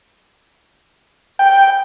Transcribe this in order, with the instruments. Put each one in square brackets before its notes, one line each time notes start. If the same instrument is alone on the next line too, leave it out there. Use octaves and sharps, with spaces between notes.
[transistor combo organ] G5